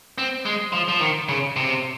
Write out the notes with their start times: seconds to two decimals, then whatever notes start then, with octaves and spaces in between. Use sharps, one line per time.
0.18 C4
0.45 G#3
0.73 F3
0.88 F3
1.01 D#3
1.29 C#3
1.56 C3